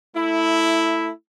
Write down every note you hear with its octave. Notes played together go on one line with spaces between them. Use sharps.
A3 E4